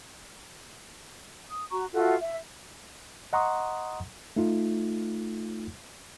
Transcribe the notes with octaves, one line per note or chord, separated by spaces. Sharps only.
D#6
F#4 A#5 C#6
F4 F#4 A4 E5
E5
D#5 F#5 A#5 C6 C#6 D#6
A3 D#4 F4